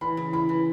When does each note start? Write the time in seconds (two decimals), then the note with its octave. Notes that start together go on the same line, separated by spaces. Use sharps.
0.01 E3 B5
0.17 C#3
0.33 E4 B5
0.49 E3